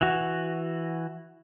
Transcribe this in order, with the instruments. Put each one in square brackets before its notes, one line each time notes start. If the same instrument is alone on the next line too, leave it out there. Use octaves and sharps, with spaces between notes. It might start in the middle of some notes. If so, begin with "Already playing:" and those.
[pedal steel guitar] E3 F#4